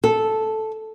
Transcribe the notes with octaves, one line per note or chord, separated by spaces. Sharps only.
A4